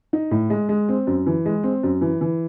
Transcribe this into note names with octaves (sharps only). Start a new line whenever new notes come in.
D#4
A2
G#3
G#3
C4
F#2
E3
G#3
C4
F#2
E3
E3